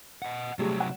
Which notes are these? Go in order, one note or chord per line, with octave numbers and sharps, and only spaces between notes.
D#5 F#5
C3 F#3 G3 A3 G#4
F#5